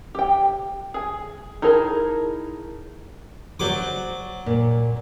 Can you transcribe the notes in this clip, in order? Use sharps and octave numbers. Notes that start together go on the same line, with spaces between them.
G4 G5
G#4 G#5
D#4 E4 G#4 A#4 A5
F#3 F#4 C5 D5 D6
A#2